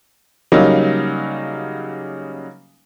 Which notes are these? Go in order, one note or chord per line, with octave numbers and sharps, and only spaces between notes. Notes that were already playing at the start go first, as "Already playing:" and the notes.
C#3 F#3 G3 A#3 D#4